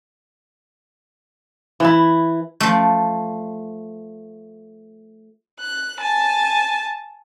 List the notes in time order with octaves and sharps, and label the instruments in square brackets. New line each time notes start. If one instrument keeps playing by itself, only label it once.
[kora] E3 E4
[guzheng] F3 A3
[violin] F#6
G#5 A5